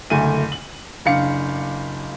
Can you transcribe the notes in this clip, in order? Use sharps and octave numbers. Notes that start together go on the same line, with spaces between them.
F#1 D2 A3 D#7
F#7
F#1 D4 F5 C#7